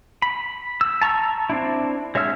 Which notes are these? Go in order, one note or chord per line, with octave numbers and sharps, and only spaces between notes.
B5
E6
A5 A#5 C#6 E6
C4 D4 E4
G#3 C#5 E5 E6 F6